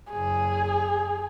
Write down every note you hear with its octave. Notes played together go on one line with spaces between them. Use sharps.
F#1 G#4